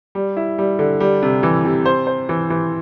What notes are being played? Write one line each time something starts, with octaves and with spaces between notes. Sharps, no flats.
G3
E4
G3
D3
G3
C3
E3
C3
C5
C5
E3
E3